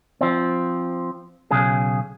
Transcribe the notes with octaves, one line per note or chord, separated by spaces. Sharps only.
F3 C4
B1 C#3 G#4